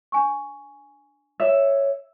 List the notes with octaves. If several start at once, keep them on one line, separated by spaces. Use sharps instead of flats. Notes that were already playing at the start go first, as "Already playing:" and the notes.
D4 G#5 C#6
C#5 E5